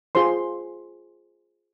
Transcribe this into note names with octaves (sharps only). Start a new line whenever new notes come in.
F4 G#4 C5 C6